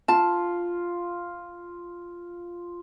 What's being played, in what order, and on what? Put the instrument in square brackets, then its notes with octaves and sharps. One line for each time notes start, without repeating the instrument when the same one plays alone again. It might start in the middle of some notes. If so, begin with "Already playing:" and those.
[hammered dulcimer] F4 [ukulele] A5